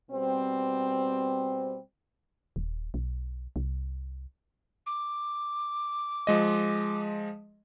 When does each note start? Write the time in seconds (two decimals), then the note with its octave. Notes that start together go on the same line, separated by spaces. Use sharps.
0.11 B2 G3 C4
2.56 D#1
2.94 B1
3.56 C2
4.86 D6
6.27 F3 G#3 D#5